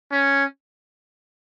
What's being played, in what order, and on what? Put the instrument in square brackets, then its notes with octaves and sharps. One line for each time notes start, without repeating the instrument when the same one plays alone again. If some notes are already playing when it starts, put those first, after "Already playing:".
[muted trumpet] C#4